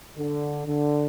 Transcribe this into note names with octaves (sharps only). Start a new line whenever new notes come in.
D3
D3